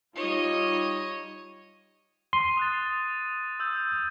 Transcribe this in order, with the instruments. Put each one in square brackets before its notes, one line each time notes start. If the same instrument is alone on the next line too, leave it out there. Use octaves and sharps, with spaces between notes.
[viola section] G3 D#4 F4 [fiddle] C#5 D#5
[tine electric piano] C6 [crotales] D#7
[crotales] D#6 F#6 A6
D#6 E6 G6